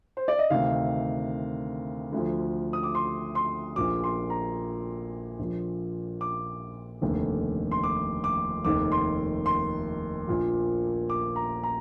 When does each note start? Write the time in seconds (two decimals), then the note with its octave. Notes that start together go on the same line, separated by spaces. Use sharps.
0.17 C5
0.28 D5
0.39 D#5
0.50 D2 C3 D#3 F5
2.13 D2 D3 F3
2.73 D#6
2.83 D6
2.95 C6
3.35 C6
3.76 A#1 A#2 F3 D6
4.04 C6
4.30 A#5
5.39 A#1 A#2 F3
6.21 D6
7.02 F1 D#2 D3
7.71 C6
7.83 D6
8.24 D6
8.65 F1 D#2 D#3 D6
8.92 C6
9.46 C6
10.27 A#1 A#2 F3
11.10 D6
11.36 A#5
11.63 A#5